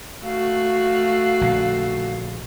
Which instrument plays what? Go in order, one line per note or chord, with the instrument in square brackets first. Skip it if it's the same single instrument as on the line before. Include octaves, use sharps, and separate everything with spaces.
[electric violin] A3 F#4 [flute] F5
[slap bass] A#1 D3